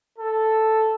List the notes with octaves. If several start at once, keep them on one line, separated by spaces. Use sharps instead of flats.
A4